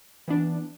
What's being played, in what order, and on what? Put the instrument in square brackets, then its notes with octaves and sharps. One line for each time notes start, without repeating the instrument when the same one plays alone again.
[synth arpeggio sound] E3 B3 D4